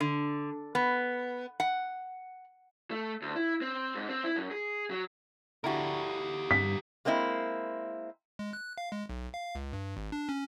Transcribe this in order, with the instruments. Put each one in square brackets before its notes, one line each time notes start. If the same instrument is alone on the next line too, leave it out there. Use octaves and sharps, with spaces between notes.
[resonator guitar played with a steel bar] D3
B3
F#5
[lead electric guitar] A3
D2
E4
C4
G#2
C4
E4
F#2
G#4
F#3
[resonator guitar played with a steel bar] D3 E4 F#4 [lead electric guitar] G4 A#4
[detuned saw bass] G2 [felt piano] B6
[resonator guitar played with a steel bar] G#3 A#3 C4 D#4 E4
[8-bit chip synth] G#3
F#6
F5
G#3
B1
F5
C#2
G2
G#1
D4
C#4